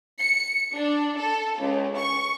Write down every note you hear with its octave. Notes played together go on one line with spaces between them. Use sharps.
C#7
D4
A4
C#2
C#6